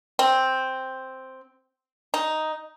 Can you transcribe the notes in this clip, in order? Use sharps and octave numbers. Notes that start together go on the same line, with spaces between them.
C4
D#4